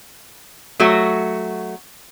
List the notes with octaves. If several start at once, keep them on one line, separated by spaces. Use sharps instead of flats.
F#3 A3 F#4